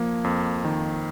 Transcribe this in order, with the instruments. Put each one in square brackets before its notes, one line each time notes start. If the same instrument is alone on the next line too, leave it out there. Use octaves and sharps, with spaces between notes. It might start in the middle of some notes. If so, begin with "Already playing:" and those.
Already playing: [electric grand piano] F3 A#3
F2
D#3